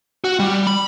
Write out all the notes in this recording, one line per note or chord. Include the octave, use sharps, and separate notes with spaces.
F#4
G3
B5